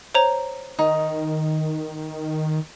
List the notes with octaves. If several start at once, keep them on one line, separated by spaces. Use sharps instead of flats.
C5 C#5 A#5
D#3 D#4